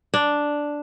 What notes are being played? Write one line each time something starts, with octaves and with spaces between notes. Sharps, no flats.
D4